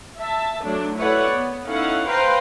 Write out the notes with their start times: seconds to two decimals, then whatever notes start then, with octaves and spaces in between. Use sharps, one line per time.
0.19 E5 A5
0.64 F#3 A3 D4
0.96 E4 A4 B4 C#5 D5 F#5
1.32 B3
1.67 C#4 D#4 E4 A4 F5 F#5
2.10 B4 C5 F5 G5 A#5 C6